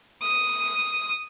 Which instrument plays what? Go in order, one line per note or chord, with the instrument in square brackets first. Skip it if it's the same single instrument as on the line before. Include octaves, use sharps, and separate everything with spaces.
[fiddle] D#6